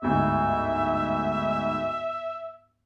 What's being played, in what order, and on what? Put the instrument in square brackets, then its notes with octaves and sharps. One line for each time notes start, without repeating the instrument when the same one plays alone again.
[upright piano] G1 D2 G#2 [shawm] E5